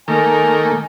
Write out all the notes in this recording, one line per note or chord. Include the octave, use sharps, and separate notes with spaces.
D#3 A3 A#3 A#4 G#5